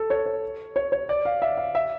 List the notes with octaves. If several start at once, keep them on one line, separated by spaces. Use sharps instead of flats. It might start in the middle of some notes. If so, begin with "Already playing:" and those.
Already playing: A4
C#5
C#5
C#5
C#5
D5
F5
E5
F5
E5